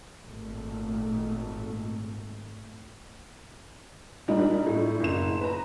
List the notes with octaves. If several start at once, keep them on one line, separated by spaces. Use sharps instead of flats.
G#1 A#2 A3
A#2 G3 D4 D#4
A2
F#1 E7
B4 A#5